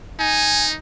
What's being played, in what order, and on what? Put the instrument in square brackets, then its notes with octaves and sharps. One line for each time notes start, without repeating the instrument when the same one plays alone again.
[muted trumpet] D#4 [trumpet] G#5